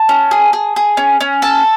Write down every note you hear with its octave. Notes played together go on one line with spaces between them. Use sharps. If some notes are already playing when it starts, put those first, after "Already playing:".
Already playing: A5
C#4
G#4
G#4
G#4
C#4
C#4
A4 A5